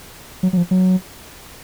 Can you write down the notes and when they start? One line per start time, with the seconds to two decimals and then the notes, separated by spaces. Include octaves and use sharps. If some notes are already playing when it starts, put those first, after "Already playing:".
0.43 F#3
0.53 F#3
0.57 F3
0.71 F#3